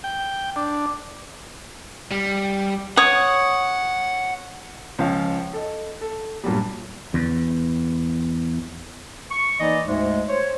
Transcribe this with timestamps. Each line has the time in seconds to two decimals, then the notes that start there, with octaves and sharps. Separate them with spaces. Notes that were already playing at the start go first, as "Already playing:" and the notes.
0.04 G5
0.56 D4
2.11 G3
2.97 C#5 F#5 D#6
4.99 C#2 F3 C#4 F5
5.53 A4 D#5
6.01 A4
6.44 G2 A#2 F#3 G3
7.14 E2
9.31 C#6
9.60 E3 A#3 D#4 D5 D#5
9.87 D2 G#2 G#3
10.28 C5 C#5